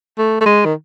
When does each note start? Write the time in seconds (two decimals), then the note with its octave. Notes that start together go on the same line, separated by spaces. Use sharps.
0.18 A3
0.41 A3
0.46 G#3
0.65 D#3